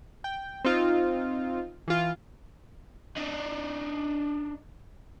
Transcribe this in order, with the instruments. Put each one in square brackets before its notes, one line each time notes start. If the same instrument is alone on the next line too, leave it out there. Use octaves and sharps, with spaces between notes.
[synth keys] G5
C4 D#4 F4
E3 F4
[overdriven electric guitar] D4 D#4